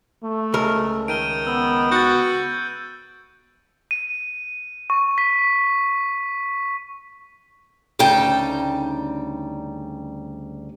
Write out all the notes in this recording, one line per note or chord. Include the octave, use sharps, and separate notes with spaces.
A3
C#2 A#4
D#3 D7 D#7 G7
B3 E6
F#4 G6 A6
D#7
C#6
B6
D2 C#3 G3 D#4 G5 A5